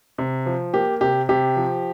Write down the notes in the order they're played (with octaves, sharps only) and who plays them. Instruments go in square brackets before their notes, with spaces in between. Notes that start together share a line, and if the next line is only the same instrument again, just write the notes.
[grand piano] C3
F3
A#3 G4
C3 G4
C3 G4
F3